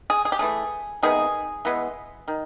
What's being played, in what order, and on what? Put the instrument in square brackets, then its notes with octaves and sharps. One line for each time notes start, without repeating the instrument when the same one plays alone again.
[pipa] G#4
G#4
G4
E3 A3 G#4
C3 D#3 G#3 B3 G#4
E3 G#3 B3
D#3